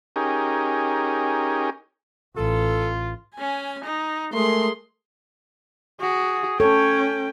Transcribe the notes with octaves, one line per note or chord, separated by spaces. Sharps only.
C#4 D#4 G4 G#4 A#4
A1 F4 A4
C#4 G#5
D#4
G#3 A3 G#4 A#4 C6
F#4 G#4
C#4 A4 C#5 G5